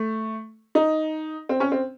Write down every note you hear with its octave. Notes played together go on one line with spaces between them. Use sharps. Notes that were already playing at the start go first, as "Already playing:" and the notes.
Already playing: A3
D#4
C4
C#4
C4